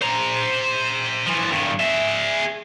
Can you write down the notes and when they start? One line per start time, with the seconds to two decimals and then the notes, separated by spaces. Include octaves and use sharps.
0.02 C5 A#5
1.26 E3 F3
1.51 G2 D#3
1.80 G#4 E5